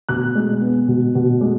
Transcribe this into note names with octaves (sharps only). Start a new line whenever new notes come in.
B2 F#6
G#3
B3
B2
B2
G#3